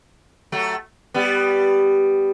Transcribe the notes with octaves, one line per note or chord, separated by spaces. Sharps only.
F#3 A3
G3 B3